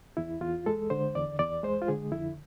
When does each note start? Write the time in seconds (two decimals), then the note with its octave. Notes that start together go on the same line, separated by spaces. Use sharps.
0.17 E2 E4
0.41 E2 F4
0.66 G#3 A4
0.90 D3 C5
1.15 E2 D5
1.39 E2 D5
1.63 G#3 C5
1.82 F4
1.88 D3 G#4
2.12 F2 E4